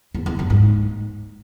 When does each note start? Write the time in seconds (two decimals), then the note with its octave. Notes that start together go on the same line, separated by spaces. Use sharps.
0.14 E2
0.26 E2
0.39 F#2
0.50 G#2